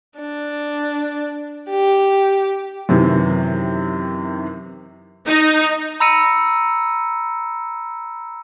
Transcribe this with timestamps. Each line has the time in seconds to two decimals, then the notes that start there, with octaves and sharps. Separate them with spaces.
0.19 D4
1.70 G4
2.89 F#2 C3 D#3 E3
5.26 D#4
6.00 A#5 B5 E6 A#6 C#7 D#7